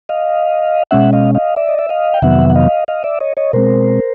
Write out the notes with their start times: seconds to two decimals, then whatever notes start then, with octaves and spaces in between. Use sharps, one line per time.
0.09 D#5 F5
0.91 B2 G#3 C#4 E5 F#5
1.13 D#5 F5
1.35 D#5 F5
1.56 D5 E5
1.69 D#5
1.79 E5
1.89 D#5 F5
2.14 G5
2.22 F2 C3 D#3 F#3 B3 E5 F#5
2.50 F#5
2.55 D#5 F5
2.88 D#5 F5
3.04 D5 E5
3.20 C#5 D#5
3.37 C#5 D#5
3.53 B2 G#3 C4 A#4 C5